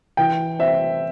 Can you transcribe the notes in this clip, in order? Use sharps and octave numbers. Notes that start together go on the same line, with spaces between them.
E3 G5
C4 E5